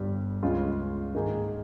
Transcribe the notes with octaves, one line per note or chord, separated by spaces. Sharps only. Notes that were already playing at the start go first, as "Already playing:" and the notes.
Already playing: G1 G2 G3
C#2 C#3 G#3 C#4 F4
G#2 D#3 A#3 D#4 G#4